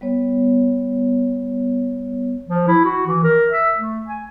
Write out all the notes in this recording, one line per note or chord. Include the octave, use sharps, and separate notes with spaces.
G3 B3 C#5
F3
E4
F#4
E3
A#4
E5
A3
G#5